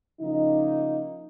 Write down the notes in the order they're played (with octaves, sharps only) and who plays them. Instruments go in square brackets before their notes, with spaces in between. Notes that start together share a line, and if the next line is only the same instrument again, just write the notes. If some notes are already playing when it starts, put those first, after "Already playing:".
[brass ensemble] C#3 F3 A#3 D#4